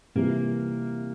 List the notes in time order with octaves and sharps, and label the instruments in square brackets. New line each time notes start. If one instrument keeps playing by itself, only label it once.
[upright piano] C3 E3 G3 C4 F4 [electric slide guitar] A#3